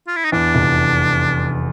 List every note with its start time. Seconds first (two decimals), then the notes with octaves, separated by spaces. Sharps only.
0.08 F4
0.16 E4
0.25 D#4
0.32 E2 D4
0.55 F1